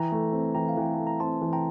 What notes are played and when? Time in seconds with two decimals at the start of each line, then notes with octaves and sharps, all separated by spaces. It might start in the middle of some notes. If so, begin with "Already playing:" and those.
Already playing: E3 G5 A#5
0.12 A3
0.33 C4
0.55 E3 G5 A#5
0.69 F5
0.77 E3 G5
0.94 A3 A5
1.07 A#5
1.20 C4 A5 C6
1.41 E3
1.53 G5 A#5